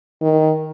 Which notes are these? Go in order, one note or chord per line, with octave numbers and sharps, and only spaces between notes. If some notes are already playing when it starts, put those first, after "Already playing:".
D#3